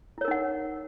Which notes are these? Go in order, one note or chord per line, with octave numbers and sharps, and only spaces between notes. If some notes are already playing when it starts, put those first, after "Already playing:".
D#4 E4 A#4 C#5 F#5